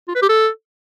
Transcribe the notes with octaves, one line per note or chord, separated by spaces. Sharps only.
F4
B4
G4
A4